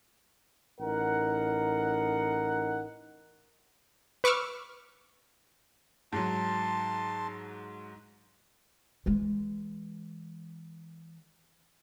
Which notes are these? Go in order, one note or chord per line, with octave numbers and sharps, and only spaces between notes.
A1 D#4 A#4 F#5
B4 C#6 D6 E6 F6
G#2 F#3 A5 C6
E3 G#3